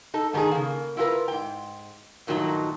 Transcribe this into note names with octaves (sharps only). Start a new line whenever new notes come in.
D#4 A4
G#2 D#3 D4 D#4 G#4
C#3 A#3
E4 F4 G4 A#4 B4
G#2 G5
G2 A#2 D#3 F#3 A3 D#4